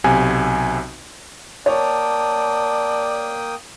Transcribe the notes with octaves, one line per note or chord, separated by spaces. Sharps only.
B1 C3 G#5
A#3 C#5 D5 G5 A5 D#6